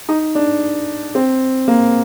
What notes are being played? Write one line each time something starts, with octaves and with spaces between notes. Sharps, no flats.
D#4
D4
C4
A#3